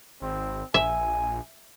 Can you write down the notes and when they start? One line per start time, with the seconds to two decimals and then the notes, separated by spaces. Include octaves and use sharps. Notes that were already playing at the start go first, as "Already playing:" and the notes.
0.22 G#1 C4
0.74 A#1 E5 G#5